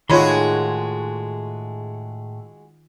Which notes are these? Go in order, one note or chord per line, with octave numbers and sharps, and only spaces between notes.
A2 D#3 G#3 F4 F#4 C#5 B5 C6